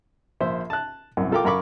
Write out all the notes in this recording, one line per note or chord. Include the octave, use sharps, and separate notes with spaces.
A#1 C5 E5
A5 F#6
C2 F#2
F4 A4 A#4 F5 G5 D6
F#2 A#4 F5 B5 C#6 D6